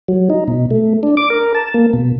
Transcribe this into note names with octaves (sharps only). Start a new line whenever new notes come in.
F#3
D#4
B2
A3
D4
D6
A#4
A5
A#3
B2